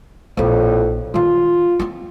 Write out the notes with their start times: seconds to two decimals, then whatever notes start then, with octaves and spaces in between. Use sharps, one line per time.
0.37 A#1 F2 A2 D#4
1.14 D#3 G3 F4
1.80 C4 F4